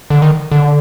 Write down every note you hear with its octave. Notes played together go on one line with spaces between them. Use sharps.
D3
D#3
D3